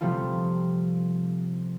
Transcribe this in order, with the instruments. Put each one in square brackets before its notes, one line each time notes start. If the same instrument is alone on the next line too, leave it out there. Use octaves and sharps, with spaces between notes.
[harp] C3 F3 G3 A3 F4